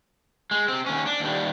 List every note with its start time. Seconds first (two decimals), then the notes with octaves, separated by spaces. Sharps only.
0.51 G#3
0.68 C3 C4
0.86 D#2 C#4
1.06 D4
1.20 D#2 G3